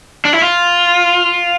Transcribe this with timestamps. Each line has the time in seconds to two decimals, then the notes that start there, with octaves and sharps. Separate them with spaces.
0.25 D4
0.33 E4
0.42 F4